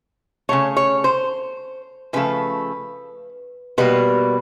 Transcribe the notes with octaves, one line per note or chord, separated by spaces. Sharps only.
C#3 F#3 A3 C#5
C#5
C5
C#3 F3 A3 B4
B2 G3 A#3 B4